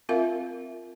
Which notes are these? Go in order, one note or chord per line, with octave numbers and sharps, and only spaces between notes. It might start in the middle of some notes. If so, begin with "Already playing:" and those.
C4 F4 A#4 E5 F5